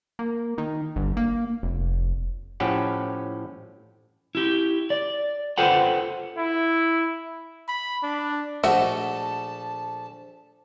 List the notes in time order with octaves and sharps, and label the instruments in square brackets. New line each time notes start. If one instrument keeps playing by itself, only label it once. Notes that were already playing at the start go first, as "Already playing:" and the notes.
[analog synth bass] A#3
D#3
G1
A#3
F1
[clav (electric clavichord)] A2 F3 C#4 G4 A4 F#5
[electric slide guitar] E4 G4
D5
F4 A4 B4 C5 F#5 G5
[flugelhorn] E4
[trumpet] B5
D4
[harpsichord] A#1 A3 D#5 [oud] F#4 [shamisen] E5 [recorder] A5